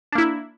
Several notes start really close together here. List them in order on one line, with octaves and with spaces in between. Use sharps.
D4 A#3 E4